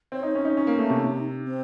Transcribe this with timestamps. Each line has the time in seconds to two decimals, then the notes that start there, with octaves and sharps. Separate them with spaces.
0.12 C4 C#5
0.23 D#4
0.35 C#4
0.45 D#4
0.56 C#4 D#4
0.67 A#3
0.78 A3
0.90 C3
1.45 C4